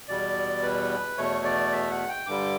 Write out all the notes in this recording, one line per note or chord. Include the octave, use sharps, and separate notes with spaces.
E2 B2 G3 D5
B4
E2 B2 A3 C#5
D5
E5
F#5
G5
G2 D3 G3 D6